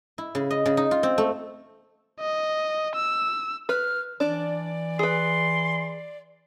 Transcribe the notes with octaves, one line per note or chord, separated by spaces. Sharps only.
E4
C#3
D#5
C#3
D#4
F4
C4
A3
D#5
E6
B4 F6
E3 D4 D5
G#4 B4 C6